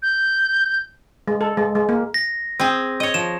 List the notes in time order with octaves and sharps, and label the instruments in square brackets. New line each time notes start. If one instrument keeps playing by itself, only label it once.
[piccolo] G6
[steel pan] G#3
A4
G#3
G#3
A#3
[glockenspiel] A#6
[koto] C4 G#4
C#5 D#5
[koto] F3 [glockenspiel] E7